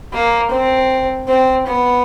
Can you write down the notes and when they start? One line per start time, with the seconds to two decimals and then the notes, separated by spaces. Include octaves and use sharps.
0.13 A#3
0.51 C4
1.28 C4
1.66 B3